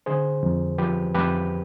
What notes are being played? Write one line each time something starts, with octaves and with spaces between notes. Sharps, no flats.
D3 G#4 C5
F2
F3 G4 B4
F2 G4 B4